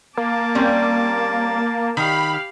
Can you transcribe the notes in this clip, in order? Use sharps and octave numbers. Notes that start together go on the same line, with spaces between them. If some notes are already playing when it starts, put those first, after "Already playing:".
A#3 A5 D6
G3 C4 C#4
D#3 G4 F5 B5